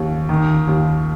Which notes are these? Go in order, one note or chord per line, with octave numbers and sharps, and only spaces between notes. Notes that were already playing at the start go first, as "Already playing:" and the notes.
Already playing: D#2
D#3
D#2